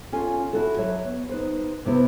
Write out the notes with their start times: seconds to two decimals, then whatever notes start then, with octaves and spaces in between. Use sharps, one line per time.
0.12 C#4 F4 A4 G#5
0.53 E4 F#4 A4
0.77 F#3 C#5 E5
1.05 B3
1.29 D#4 B4 C5
1.85 C3 B3 E4 B4